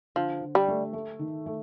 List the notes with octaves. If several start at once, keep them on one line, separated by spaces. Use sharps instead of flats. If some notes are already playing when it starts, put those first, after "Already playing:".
D3 F3
D3
G3
A3
A3
D#3
A3